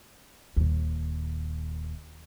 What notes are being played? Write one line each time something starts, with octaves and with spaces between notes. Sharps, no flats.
D#1 D#2